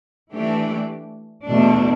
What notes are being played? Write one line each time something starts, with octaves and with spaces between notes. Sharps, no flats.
E3 A3 D4 G4
E2 B2 A3 D4